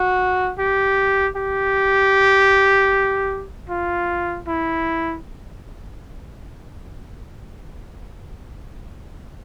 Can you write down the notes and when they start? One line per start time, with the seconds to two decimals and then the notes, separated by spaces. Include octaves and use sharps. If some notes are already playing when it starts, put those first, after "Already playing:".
Already playing: F#4
0.58 G4
1.36 G4
3.69 F4
4.47 E4